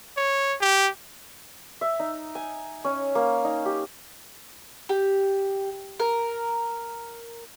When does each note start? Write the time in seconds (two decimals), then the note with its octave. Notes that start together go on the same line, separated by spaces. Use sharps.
0.17 C#5
0.61 G4
1.81 E5
2.00 D#4
2.35 G#5
2.85 C#4
3.15 A#3
3.44 D#4
3.66 G4
4.89 G4
6.00 A#4